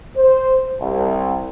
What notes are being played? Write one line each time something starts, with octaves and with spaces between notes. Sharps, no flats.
C5
C2